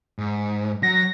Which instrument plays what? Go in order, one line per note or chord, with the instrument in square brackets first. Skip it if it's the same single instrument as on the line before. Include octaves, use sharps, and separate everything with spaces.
[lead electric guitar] G#2
[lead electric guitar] F#3 [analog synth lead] A#6